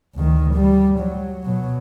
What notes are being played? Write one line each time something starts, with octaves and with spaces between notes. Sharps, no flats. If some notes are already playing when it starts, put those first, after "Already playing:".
D2 D#3
G3
F#3
B2 F#3